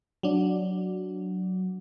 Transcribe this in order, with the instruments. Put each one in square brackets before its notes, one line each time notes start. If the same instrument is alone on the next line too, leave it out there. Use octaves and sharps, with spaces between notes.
[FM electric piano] F#3 D4